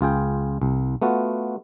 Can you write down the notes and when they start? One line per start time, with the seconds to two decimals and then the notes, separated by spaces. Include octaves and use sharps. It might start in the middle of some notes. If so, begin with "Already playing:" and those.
0.01 C#2 F4 G#4 G5
0.62 C2
1.02 A3 B3 F4 F#4